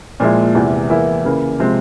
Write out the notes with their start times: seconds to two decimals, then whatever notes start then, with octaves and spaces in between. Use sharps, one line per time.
0.20 A#2 F3 G#3 E4
0.54 E2 C3 E3
0.89 E2 E3 A#3 E4
1.25 C#3 E3 A#3
1.59 C3 F3 G#3 C4